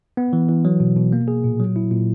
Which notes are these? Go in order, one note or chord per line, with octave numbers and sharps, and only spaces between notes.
B3
E3
E3
F#3
B2
B2
A#3
G#4
A#2
F#3
E4
A#2